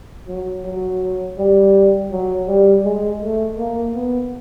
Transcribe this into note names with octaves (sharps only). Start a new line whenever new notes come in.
F#3
F#3
G3
F#3
G3
G#3
A3
A#3
B3